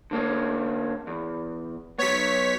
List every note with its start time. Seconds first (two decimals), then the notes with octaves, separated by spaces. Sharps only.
0.11 D3 A#3 C#4
1.07 E2
1.99 F#3 B3 C#5 B6